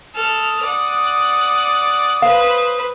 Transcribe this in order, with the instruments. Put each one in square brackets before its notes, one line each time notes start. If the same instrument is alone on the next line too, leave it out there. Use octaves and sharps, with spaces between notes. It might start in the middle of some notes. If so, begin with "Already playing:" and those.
[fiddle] A4 F6 [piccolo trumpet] D#6
[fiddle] D5 F#5
[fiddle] B4 C5 [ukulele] F5